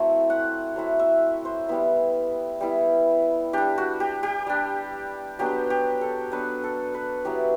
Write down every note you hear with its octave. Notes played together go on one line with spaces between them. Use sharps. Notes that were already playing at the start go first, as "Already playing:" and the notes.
Already playing: F#3 A3 C4 E4
F#5
F#3 A3 C4 E4
E5
C5
G3 B3 E4
G3 B3 E4
G3 D4 G4
F#4
G4
G4
G3 D4
F#3 B3 D4 G4
G4
A4
F#3 B3 D4 B4
A4
B4
F#3 B3 E4 G4